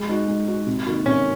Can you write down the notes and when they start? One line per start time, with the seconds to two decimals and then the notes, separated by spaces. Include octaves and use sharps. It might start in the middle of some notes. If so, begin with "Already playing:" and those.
Already playing: G#3
0.09 D#4 F#4
0.28 G#3
0.48 D#4 F#4
0.67 C3
0.86 D#3 A#3 D#4 F#4
1.06 C3 C#4